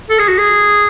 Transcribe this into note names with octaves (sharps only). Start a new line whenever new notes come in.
A4
G#4
F#4
G#4